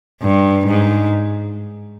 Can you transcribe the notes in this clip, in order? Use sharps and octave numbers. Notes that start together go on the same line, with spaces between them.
G2
G#2